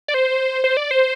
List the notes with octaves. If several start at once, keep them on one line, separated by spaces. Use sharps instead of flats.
D5
C5
C5
D5
C5